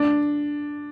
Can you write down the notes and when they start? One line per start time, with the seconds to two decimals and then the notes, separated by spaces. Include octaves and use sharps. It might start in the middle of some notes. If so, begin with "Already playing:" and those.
Already playing: D4